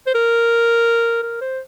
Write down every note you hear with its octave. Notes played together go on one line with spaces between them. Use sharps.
C5
A#4
A#4
C5